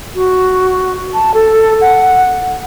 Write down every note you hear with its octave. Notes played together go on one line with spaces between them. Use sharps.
F#4
A5
A4
F#5